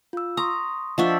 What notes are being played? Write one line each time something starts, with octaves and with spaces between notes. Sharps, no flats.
F4 E6
A#5 C6 C#6 D#6
F3 D4 D#5 E5 F#5 C#6